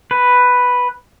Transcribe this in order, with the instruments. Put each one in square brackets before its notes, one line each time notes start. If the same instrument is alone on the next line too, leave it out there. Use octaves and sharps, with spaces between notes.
[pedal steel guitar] B4